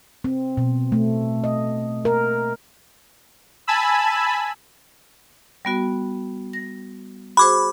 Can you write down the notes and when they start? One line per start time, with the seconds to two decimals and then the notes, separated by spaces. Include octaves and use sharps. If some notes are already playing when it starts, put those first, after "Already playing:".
0.24 C4
0.57 B2
0.92 A3
1.44 D#5
2.05 A#4
3.67 G#5 A5 B5 E6
5.65 G3 B3 F#4
6.53 A#6
7.37 F#4 G#4 C5 B5 D6